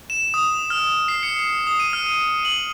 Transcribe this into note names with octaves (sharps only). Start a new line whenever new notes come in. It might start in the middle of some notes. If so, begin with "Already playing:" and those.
E7
D#6
F6
C7
C#7
D#6
D#7
F6
F#7